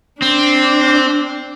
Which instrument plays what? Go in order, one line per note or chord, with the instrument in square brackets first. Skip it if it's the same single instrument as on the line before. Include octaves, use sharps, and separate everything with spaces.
[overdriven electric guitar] C4 [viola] D4